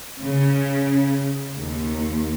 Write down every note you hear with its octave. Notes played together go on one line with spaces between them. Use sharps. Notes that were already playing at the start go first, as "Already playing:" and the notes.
C#3
D#2